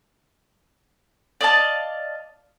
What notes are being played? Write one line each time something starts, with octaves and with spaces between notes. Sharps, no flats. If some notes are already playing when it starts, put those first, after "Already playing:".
D5 D#5 F5 A5